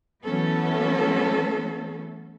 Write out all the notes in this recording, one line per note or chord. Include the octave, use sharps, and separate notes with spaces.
E3 F#3 A3 B3 C#4 A4